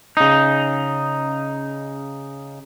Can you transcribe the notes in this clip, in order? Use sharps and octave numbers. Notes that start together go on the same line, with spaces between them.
C#3 D#4